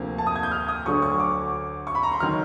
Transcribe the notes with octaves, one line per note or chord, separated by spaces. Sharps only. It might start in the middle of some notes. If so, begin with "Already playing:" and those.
Already playing: D2 C3 F3 A#3
A5
D#6
G#6
G6
F6
D#6
D2 D3 F#3 C#6
C#6
D6
C#6
B5
A#5
C6
D#3 F#3 F6